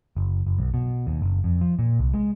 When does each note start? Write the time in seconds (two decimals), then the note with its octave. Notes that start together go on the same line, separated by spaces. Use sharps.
0.17 F#1
0.47 F#1
0.58 B1
0.74 B2
1.07 D#2
1.22 F#1
1.44 F2
1.61 F3
1.79 A#2
1.99 C2
2.14 G#3